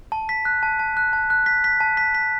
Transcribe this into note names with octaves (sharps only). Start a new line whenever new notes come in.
A5
B6
F#6
A5
A5
F#6
A5
F#6
B6
B6
A5
B6
B6